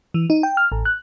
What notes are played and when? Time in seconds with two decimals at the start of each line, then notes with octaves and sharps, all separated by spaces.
0.14 E3
0.30 D#4
0.43 G5
0.57 F6
0.72 A1
0.85 F#6